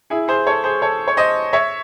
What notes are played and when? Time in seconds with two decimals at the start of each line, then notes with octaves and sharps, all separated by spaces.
0.10 E4 G#4
0.28 G#4 C5
0.47 A4 C#5
0.64 G#4 C5
0.82 A4 C#5
1.08 C#5
1.17 C5 D#5
1.53 C#5 E5